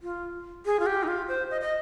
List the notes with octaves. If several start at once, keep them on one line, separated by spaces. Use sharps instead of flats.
F4
G#4
F4
G4
D#4
F4
C5
D#5
D#5